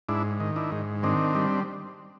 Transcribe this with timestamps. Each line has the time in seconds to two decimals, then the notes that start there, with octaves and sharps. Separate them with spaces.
0.09 G#2 D4 E4
0.40 D#3
0.56 D4 E4
0.72 G#2
1.03 D#3 C4 D4
1.35 G3